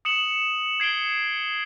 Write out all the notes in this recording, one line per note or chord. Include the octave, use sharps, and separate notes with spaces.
D#6 C#7 E7 F#7
G#6 C7 D7 G7